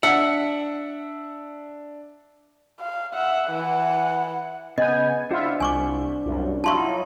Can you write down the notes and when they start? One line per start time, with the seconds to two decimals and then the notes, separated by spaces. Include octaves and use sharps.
0.03 D4 E5 F#5
2.80 F5
3.15 E5 F#5
3.51 E3 F#5
4.78 C#3 B3 D#5 G#5 G6
5.31 D4 E4 F4 C5 E5 F#5
5.60 C2 G#5 C#6 D6
6.25 C2 F#2
6.64 F#3 E4 F4 A5 C6 C#6
6.78 D#4